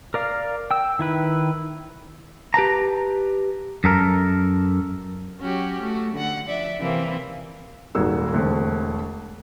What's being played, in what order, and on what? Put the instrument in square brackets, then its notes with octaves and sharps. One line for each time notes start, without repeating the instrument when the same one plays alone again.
[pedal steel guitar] A#4 D5 F5
G5 E6
D#3 E4 B4
[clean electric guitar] G4 B4 A5 A#5
F#2 A4 A#4
[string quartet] F#3 C#4 F#4 G4
A3 F#4
D3 F#5
F3 D5 E5
C3 E3 A#3 C4
[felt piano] D#1 G#1 A#3 F#4 G#4 E6
E1 D3 A3 C4